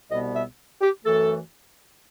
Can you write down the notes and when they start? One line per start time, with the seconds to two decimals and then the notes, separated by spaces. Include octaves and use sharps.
0.10 C2 B2 G3 B3 D#5
0.35 E5
0.81 G4
1.05 F#2 E3 A3 A4